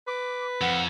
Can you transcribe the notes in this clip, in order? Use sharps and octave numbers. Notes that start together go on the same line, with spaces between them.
B4 D6
F2 F#5